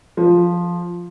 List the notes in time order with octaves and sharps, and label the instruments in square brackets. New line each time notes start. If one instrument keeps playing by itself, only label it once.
[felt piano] F3